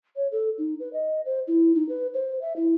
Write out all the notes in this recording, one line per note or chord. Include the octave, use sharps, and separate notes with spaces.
C#5
A4
D#4
B4
D#5
C5
E4
D#4
B4
C5
E5
E4